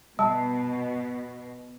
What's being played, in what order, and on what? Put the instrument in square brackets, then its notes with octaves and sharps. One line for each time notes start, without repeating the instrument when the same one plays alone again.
[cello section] B2 [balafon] G3 [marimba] A5